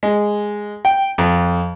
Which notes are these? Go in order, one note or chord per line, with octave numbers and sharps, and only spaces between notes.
G#3
G5
F2